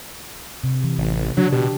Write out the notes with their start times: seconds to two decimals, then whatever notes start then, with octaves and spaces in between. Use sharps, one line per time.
0.64 C3
0.84 E3
0.99 A1
1.37 C#3 F#3 D4
1.52 B2 G4